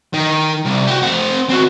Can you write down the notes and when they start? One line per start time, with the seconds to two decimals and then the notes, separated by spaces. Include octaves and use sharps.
0.14 D#3
0.65 C2
0.87 F#4 G4
1.03 C4 F#5
1.49 C4 F#4